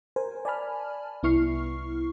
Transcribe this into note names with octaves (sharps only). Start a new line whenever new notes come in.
A#4 C5 G#5
D5 G#5 A5 B5 F6
C2 B3 E4 C#6 F6 C7